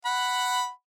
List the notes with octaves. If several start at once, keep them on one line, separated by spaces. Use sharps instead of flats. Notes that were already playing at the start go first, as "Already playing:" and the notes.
F#5 B5